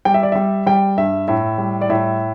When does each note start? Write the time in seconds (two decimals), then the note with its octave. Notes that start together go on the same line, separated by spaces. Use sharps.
0.05 G3 G5
0.14 E5
0.23 D5
0.32 G3 E5
0.66 G3 G5
0.97 G2 E5
1.28 A2 E5
1.58 G3
1.81 D5
1.89 A2 E5